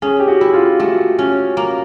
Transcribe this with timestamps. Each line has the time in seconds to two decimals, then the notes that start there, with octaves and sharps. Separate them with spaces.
0.02 C#4 G#4
0.19 G4
0.28 F#4
0.41 E4
0.53 F4
0.80 A3 F#4
1.19 C#4
1.57 A#3